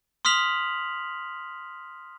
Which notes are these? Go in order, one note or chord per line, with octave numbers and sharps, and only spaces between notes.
C6 D#6 F6 B6 F7 F#7